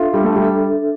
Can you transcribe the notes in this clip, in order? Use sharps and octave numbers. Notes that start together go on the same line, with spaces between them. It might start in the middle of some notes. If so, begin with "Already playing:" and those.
Already playing: D4 F4 A4 E5
G3 D4 A4 E5
A3
G3
D4 A4 E5